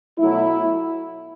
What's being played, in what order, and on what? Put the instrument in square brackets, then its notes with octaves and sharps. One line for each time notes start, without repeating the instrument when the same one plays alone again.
[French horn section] B2 F#3 A3 E4